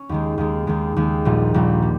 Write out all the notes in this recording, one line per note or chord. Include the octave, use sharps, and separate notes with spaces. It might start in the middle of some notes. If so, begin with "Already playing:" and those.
Already playing: C#4
D#2 D#3 G#3
D#2 D#3 G#3
D#2 D#3 G#3
D#2 D#3 G#3
A#1 A#2 G3
A#1 A#2 G3
G3